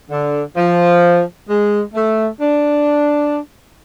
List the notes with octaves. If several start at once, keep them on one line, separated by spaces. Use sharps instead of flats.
D3
F3
G#3
A3
D4